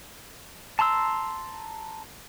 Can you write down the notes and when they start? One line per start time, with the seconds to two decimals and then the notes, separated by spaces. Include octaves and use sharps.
0.79 A5 A#5 C6 E6